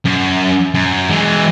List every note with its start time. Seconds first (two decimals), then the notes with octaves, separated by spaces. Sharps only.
0.05 F#2
0.74 F#2
1.10 E3 G#3